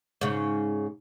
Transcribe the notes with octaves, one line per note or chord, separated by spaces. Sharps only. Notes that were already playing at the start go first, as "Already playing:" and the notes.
G#2 C#3